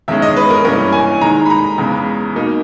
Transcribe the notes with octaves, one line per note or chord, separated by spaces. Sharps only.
E2 D#3 G#3 C#4 E5
D#5
B4
A#4
G2 E3 A#3 C#4 A#4
G#5
D#3 G#3 D#4 A#5
B5
A#5
E2 C#3 G#3
B2 A#3 D#4